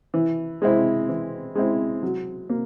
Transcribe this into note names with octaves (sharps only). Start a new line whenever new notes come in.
E3
G#3 C4 E4
E3
G#3 C4 E4
F#3
A#3